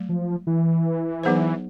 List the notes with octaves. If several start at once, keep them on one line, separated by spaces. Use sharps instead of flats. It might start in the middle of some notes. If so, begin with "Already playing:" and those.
Already playing: F#3 A3
F3
E3
F#3 B3 D#4 G#4 C5